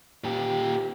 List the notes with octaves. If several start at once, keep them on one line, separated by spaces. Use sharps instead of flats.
A#2 G4